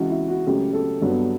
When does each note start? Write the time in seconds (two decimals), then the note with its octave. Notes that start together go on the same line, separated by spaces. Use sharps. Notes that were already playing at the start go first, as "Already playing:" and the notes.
Already playing: C#2 C#3 E3 F#4
0.10 E4
0.28 F#4
0.47 C#2 C#3 F#3 A3 G4
0.73 A4
1.01 G1 G2 F#3 B3